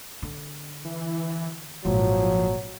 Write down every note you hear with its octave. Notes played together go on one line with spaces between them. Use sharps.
D3
E3
G#1 A#2 F3 F#3